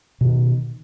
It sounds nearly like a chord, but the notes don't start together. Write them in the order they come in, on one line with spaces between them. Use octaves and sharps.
B2 D3 D#3